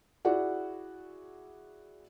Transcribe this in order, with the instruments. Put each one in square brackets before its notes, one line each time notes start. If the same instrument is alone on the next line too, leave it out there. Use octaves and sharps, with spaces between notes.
[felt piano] E4 F#4 G#4 D5 F#5